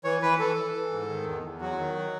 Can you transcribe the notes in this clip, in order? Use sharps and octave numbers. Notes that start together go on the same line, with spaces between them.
E3 C#5
E3 B4
E3 A4
E3
E3
G#2
D#3
E2
E2
F#3 F#4
D#3
F#3